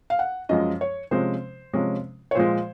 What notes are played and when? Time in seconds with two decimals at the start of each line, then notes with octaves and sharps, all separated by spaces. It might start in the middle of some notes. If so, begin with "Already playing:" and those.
0.10 F5
0.19 F#5
0.49 F#2 F3 G#3 D#5
0.81 C#5
1.11 C3 F3 G#3 C#4 C5
1.74 C3 F3 G#3 C#4
2.31 C#5
2.35 A#2 F3 G#3 C5